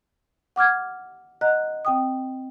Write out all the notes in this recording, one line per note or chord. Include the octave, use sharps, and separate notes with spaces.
F#5 D6 F6 G#6
D#5 F#5 A#5 F#6
C4 G5 D#6